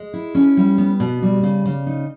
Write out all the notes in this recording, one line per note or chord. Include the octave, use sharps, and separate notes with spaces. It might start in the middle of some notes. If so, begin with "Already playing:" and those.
Already playing: G#3
E4
C#4
G3
B3
B2
G3
C#3
C#3
D#4